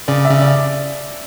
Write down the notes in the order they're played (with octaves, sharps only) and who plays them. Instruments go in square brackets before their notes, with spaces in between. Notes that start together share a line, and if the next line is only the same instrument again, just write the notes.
[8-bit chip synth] C#3 [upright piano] D5
[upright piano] E5
[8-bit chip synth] C#3
[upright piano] D5